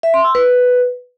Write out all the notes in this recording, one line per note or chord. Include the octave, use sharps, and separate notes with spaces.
E5
C6
E6
B4